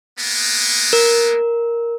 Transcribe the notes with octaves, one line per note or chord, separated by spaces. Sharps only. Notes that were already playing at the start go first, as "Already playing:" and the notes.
G#3 A#3 B3
A#4